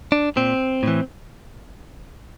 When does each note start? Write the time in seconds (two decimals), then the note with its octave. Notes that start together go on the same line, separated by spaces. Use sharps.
0.12 D4
0.36 A#2 C4
0.83 A2 E3